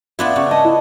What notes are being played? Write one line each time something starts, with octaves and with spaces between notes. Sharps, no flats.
B3 D4 E4 F4
C#3 C#6
D#5 A5
E4